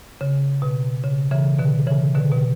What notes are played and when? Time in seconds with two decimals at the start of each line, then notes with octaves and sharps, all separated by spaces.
0.21 C#3
0.62 B2
1.04 C#3
1.31 C#3 E3
1.59 B2 D3
1.87 C#3 E3
2.14 B2 D3
2.31 B2